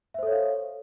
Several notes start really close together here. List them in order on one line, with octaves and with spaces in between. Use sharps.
E5 C5 A4 C#5 F5